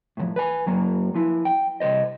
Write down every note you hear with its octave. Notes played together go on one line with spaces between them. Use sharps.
A2 C#3 F3
B4 G#5
F#2 F#3 A#3
F3 E4
G5
C2 C#3 C5 D#5